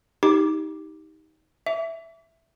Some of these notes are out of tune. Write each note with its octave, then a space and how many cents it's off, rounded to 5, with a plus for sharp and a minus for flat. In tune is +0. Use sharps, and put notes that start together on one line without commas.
D#4 +20 G4 +0 D6 +0
E5 +0 D6 -40